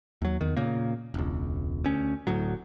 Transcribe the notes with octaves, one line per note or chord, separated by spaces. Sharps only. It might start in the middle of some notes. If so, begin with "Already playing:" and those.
D#2 F#3
E2 D#3
A#2 C#3 A#3
E1 C#2
D2 C#4
D1 D2 A2 F#3